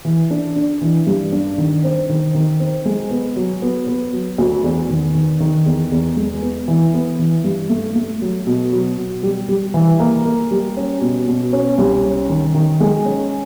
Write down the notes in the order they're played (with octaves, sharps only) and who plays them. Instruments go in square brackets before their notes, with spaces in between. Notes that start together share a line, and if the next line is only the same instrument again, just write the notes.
[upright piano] E3
D4
D4
E3
G2
D4
D#3
C4
D#3
D#3
C4
G#3
B3
F#3
B3
B3
F#3
D2
E2
D#3
D#3
D#3
E2
E2
G#3
B3
E3
B3
E3
G2
A3
A3
F#3
B2
F#3
B2
G3
G3
E3
A#3
A#3
G3
C#4
B2
B2
C#4
C2
C#4
D#3
D#3
G#3
C#4